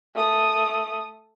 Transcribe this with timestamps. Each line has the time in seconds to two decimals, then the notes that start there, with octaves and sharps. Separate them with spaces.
0.15 A3 D#6